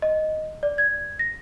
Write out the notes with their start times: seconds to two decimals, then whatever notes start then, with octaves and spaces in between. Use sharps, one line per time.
0.02 D#5
0.63 D5
0.78 G#6
1.19 A#6